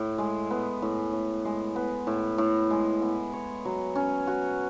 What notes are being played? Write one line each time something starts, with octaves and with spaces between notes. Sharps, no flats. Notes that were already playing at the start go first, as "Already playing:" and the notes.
Already playing: A2
G#3
B3
A2
A2
G#3
B3
A2
A2
G#3
B3
C#5
F#3
C#4
F#4